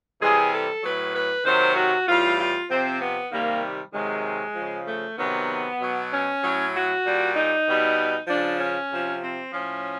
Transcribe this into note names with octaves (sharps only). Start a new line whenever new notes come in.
C3 E3 G3 G#4
A4
A2 F#3 B4
B4
C3 D#3 F#3 C5
F#4
A2 E3 G3 F4
F4
C3 F3 C4
B3
C3 D#3 G3 A#3
C3 D#3 F#3 G#3
C#3 F3
A3
C3 D#3 F#3 B3
B2 F#3
C#4
A2 F#3
F#4
A#2 G3
D#4
B2 G3
C#3 F3 D4
C#4
C3 F3
C4
A2 F3 C#4